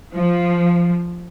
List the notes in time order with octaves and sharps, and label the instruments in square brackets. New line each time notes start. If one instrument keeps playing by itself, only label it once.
[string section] F3